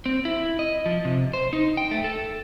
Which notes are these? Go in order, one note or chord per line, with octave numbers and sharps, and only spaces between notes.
C4
E4
D#5
F3
C3
C5
D#4
G5
A3
A4